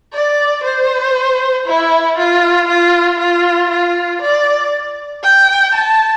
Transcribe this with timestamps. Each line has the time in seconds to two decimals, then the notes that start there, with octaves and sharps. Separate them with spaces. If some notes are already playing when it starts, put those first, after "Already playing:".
0.13 D5
0.64 C5
1.66 E4
2.17 F4
2.68 F4
3.19 F4
3.70 F4
4.22 D5
5.23 G5
5.74 A5